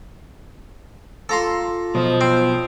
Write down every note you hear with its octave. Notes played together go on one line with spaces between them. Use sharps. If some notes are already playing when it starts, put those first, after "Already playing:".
F4 A4 A#5 C6 D6
B1 B2 F3 D#5
C4